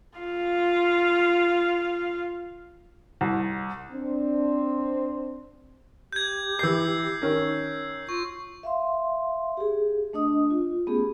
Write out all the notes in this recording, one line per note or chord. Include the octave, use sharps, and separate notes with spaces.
F4 F5
C2
C4 D4
G4 G6 G#6
E3 E6 G6 C7
D#3 C#4 A#4
F4 C#6
E5 F5 C6
G4 G#4
A3 D4 D#5 D#6
F4
A3 B3 C#4 G4 G#4